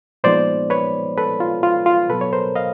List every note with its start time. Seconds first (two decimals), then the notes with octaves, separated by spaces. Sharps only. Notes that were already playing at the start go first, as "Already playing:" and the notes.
0.24 A#2 F3 G#3 B3 D#4 C5 D5
0.70 B4 C#5
1.18 A4 B4
1.40 F4
1.63 F4
1.86 F4
2.09 B2 F#3 B3 A4 B4
2.21 C#5
2.33 A#4 C5
2.56 D#5 F5